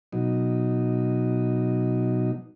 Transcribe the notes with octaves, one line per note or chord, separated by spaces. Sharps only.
B2 F#3 D#4